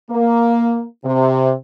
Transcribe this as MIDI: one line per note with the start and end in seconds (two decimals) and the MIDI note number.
0.11 0.84 58
1.05 1.52 48